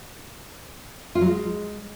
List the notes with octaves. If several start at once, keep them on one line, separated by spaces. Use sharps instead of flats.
F4
F#3
G#3